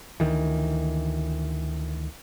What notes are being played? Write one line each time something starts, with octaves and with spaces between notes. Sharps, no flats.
D2 D#3 E3